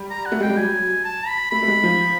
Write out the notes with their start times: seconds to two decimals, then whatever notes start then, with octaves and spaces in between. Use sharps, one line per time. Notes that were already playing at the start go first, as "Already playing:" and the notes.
Already playing: G3
0.11 A#5
0.26 F#5
0.32 A3
0.40 G#3 G5
0.49 G3
0.57 F#3 G#5
1.04 A5
1.28 B5
1.51 A3 B5
1.62 A3
1.68 G#3
1.83 F3